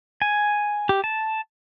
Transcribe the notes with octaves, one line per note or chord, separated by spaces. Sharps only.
G#5
G4
A5